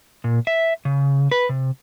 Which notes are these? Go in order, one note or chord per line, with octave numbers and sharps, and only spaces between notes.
A#2
E5
C#3
B4
C3